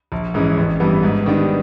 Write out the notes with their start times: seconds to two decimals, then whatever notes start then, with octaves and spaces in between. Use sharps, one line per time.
0.12 A#1
0.34 G#2 E3 G#3 C#4
0.57 A1
0.80 G2 E3 G3 B3
1.03 G#2
1.26 D#3 G3 B3 D4